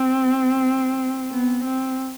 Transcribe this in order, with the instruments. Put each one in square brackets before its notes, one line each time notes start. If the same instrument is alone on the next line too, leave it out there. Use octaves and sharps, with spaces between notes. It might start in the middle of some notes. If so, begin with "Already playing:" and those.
Already playing: [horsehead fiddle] C4
B3
C4